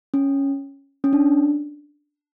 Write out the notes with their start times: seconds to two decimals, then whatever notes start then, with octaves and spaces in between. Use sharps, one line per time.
0.14 C#4
1.04 C#4
1.13 D4